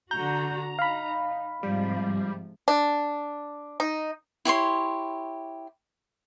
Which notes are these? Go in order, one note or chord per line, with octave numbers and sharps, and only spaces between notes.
D3 F#4 A#5 G6
D#4 F5 B5
G#2 C3 F3 G3
D4
D#4
E4 G4 C#5 C6